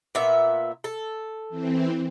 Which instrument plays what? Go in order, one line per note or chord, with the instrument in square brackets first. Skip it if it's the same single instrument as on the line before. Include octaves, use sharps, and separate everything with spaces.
[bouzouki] A#2 B3 E5
A4
[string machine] E3 C4